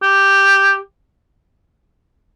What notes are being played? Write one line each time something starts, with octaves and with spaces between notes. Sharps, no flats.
G4